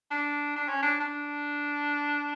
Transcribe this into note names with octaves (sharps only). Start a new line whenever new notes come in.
D4
D4
C#4
D4
D4